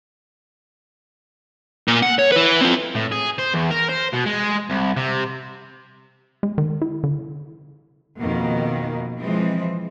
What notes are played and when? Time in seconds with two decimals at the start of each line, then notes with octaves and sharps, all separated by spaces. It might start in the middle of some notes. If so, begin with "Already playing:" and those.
1.88 A#2
2.02 F#5
2.19 C#5
2.32 E4 B4
2.61 C4 F4
2.95 A2
3.12 G#4
3.39 C5
3.54 E2
3.71 A#4
3.89 C5
4.14 B2
4.26 G#3
4.70 C2
4.97 C3
6.43 G#3
6.58 D#3
6.82 E4
7.04 D3
8.19 F2 B2 D#3 A#3
9.20 E3 F3 G#3 C4